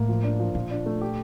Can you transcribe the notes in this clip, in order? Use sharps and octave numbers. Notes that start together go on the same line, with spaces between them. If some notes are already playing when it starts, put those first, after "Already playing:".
Already playing: A2 A#3
F3
D4
F3
A#2 F4
D4
A3
G4